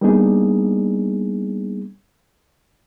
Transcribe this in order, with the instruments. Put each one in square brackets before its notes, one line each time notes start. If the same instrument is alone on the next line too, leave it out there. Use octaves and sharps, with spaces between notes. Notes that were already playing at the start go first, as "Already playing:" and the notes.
[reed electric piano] G3 A#3 B3 D4 D#4 G#4